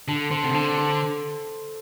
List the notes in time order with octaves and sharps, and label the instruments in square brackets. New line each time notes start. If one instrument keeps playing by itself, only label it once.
[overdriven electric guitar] D3 [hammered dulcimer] A4
[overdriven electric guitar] D3 [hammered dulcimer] C5
[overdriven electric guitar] C3
[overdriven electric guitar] D3 [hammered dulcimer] A4
[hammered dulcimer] C5